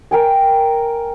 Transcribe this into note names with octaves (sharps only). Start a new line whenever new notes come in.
A#4 G5 G#5